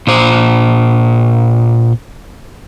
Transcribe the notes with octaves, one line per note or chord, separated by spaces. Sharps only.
A#2 C5